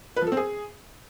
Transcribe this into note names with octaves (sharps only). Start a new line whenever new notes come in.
B4
F3
A4
C4
G#4